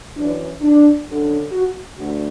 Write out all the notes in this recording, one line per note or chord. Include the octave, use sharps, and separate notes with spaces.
F#2 E3 D4
D4
F#2 D3
F#4
D2 F#4